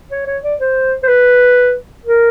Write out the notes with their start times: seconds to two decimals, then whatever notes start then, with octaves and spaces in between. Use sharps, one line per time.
0.11 C#5
0.27 C#5
0.43 D5
0.60 C5
1.03 C5
1.08 B4
2.05 A#4